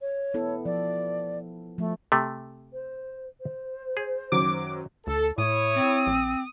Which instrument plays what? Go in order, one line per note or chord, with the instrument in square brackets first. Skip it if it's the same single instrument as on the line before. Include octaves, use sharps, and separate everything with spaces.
[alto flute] C#5
[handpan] B3 E4 A4
[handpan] F3 [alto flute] D5
[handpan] F3 [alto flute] A3
[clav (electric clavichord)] C3 A3
[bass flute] C5
C5
[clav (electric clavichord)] G#4
[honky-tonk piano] F#2 D#3 F#3 [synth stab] D6
[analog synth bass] D2 [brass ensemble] A4
[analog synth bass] A2 [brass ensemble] E4 C#5 [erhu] D#6
[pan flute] C4
[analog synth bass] A#1